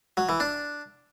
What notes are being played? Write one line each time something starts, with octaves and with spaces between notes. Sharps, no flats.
F#3
E3
D4